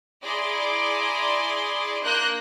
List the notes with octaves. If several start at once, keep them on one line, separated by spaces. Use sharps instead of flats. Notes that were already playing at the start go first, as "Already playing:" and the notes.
E4 G#4 D5 A#5 C6 D6
A#3 D4 A#4 F#6 G6